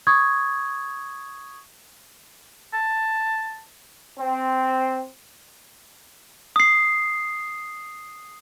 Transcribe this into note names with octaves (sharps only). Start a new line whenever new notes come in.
C#6 D#6 G#6
A5
C4
D#6 C7